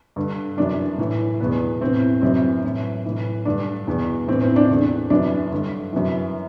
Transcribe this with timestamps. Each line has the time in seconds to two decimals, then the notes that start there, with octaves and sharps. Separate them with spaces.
0.16 G2 D3
0.57 F#2 E3 D4
0.98 A2 E3
1.40 E2 B2 B3
1.81 A2 E3 C4
2.22 F#2 E3 C4
2.63 A2 E3
3.05 A2 E3
3.45 G2 D3 D4
3.87 E2 B2
4.28 A2 E3 C4
4.42 C4
4.56 D4
4.69 E2 D3
5.10 F#2 E3 D4
5.52 G2 D3
5.93 F#2 E3